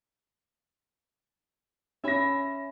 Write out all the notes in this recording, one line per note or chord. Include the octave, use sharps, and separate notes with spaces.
C#4 E5 G#5 B5 A#6